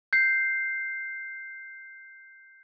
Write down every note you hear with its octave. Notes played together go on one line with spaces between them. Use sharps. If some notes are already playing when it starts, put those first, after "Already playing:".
G6 C7